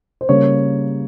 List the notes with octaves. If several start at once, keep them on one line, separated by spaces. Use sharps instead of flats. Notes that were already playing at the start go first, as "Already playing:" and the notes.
C5
C#3 G3 A#3 C#4 C#5